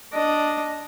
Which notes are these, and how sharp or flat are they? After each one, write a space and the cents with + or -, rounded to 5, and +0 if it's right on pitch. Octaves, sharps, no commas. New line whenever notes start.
D4 +0 D#5 +0